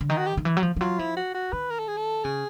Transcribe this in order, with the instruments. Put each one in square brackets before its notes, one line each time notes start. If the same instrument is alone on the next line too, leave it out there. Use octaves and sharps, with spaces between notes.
[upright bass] D3
[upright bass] D#3 [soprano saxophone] D#4
[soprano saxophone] F#4
G4
[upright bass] D#3
E3
F#3
F3
F3
[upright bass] F#3 [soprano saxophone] F4
[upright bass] F3 [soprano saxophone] E4
[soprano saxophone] F#4
F#4
[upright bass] D#3 [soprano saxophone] B4
[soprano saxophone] A#4
A4
G#4
A4
[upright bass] C#3 [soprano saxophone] G#4